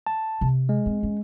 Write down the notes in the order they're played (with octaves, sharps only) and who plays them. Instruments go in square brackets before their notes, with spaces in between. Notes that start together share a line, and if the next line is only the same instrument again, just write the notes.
[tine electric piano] A5
[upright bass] C3
[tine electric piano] G#3
[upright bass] C4
C#4